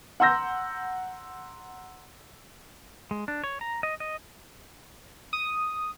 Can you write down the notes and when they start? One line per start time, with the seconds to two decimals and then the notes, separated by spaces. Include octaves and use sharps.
0.20 F#5 A#5 C6 E6 G6 A#6
3.11 G#3
3.28 D4
3.44 C#5
3.61 A#5
3.83 D#5
4.00 D#5
5.33 D#6